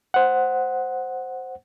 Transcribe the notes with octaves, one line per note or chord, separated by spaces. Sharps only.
C5 F#5